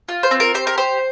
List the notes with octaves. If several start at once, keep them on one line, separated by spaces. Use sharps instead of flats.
F4
C5
C4
A#4
G4 C5
A#4
G4 C5